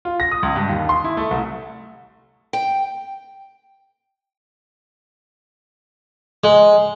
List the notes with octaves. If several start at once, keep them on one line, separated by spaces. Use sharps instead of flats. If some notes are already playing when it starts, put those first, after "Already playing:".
F4
A#6
D#6
C#2
G2
D#2
C6
E4
A3
C2
G5
G#3